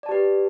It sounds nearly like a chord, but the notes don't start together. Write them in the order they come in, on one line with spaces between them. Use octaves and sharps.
D5 A5 G4 B4